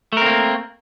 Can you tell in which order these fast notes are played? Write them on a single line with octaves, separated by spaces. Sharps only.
A3 A#4 C4 A#3